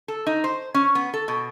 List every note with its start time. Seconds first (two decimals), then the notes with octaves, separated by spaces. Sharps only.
0.08 A4
0.27 D#4
0.44 C5
0.74 C#4
0.95 B3
1.14 A4
1.28 B2